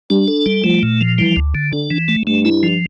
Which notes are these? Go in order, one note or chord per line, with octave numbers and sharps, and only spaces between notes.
G3 D4
A4
G3
F3 A3
A#2
F3
E3 G3
D2
D3
D3 D4
E3
A3
G2 A3
E4
F3